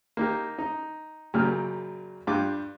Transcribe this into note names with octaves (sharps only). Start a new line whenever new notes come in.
A#3 D#4 G4
D#4
F#2 A#2 C#3 G4 F6
G2 F4 G4 D6